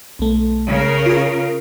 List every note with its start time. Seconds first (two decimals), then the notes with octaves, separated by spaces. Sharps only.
0.19 B1 A3
0.68 C#3 A#4
1.06 F4 G#4